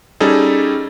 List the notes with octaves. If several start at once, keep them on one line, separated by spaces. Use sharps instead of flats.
G3 C#4 D#4 G#4 A4